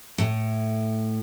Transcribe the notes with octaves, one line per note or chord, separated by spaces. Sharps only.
A2